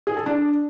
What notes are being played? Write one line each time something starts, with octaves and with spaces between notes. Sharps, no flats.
G#4
A4
D4